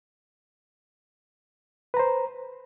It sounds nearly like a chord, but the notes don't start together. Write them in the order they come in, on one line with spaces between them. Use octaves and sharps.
B4 A#5 C5